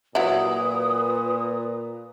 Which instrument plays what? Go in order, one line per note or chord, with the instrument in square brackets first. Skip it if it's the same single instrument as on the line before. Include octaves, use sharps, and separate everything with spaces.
[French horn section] A#2 [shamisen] F#3 E4 [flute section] B4 D#6